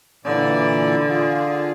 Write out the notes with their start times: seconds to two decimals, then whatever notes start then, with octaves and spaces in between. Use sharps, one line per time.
0.25 A#2 D3 E3 D5
1.09 F4 G#4